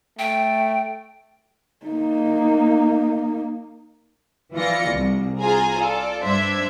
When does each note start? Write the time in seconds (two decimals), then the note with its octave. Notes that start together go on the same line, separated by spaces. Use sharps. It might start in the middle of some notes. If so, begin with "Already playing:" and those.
0.19 A3 G5
1.86 A#3 D#4
4.54 E3 F3 F4 D5 A#6 C#7
4.93 C2
5.40 F4 G#4 C5 G#5 A#5
5.79 F4 A4 D5
6.23 G2 D4 C5 E5 G#6